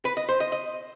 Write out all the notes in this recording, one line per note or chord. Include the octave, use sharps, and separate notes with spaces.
B4
D#5
C5
D#5
D#5